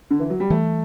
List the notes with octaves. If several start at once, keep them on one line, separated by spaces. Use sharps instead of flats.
D3
E3
F#3
G3
E3 A3